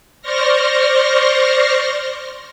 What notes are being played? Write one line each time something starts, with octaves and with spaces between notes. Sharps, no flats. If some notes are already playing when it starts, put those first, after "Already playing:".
C5 D5 C6 C#6 F6 A#6